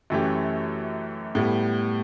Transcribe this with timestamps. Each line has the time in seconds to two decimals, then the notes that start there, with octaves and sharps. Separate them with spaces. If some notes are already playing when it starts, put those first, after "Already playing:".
0.10 F#2 E3 A3 C#4 G4
1.35 A2 G3 B3